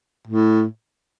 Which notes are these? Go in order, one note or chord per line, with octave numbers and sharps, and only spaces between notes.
A2